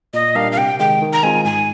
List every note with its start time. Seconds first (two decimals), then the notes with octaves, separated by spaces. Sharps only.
0.14 A#2 D#5
0.35 G3 D4 G4 A#4 F5
0.52 F5
0.57 C3 G5
0.79 D#3 G#3 G5
1.02 D#3
1.13 A#5
1.23 G#3 C4 F4 G#5
1.45 G#2 G#5